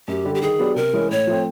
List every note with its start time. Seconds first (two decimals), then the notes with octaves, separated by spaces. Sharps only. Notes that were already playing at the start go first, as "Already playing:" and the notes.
0.08 F#2 G4
0.25 D3 G3
0.35 G4
0.42 D#3 G#4
0.59 F#3 B3 D4 G4
0.76 C3 A#4
0.93 E3 G#3 C#4
1.10 A2 C#5
1.27 F3 A3 C4